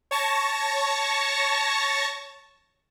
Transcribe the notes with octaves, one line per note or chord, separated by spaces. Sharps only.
C#5 A5 C#6 A#6